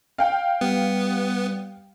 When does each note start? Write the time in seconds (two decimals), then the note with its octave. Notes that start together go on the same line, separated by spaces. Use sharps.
0.18 F5 G5
0.61 G3 B3